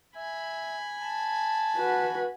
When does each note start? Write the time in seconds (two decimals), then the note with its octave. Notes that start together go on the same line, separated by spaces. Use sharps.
0.16 E5 G#5 B5
1.02 A5
1.76 F#4 B4